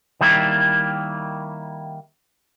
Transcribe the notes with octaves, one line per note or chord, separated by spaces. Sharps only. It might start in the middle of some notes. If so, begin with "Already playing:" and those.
D#3 G3 A#3 E4